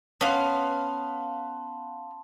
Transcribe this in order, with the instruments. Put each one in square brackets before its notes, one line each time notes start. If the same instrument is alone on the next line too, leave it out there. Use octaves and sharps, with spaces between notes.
[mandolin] B3 F5 [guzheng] C#4 [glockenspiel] A5 C6